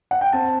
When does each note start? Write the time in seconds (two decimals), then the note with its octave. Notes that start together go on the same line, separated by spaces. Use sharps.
0.11 F#5
0.21 G5
0.33 C4 A5